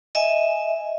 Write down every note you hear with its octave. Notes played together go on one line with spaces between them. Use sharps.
D#5 E5 G#5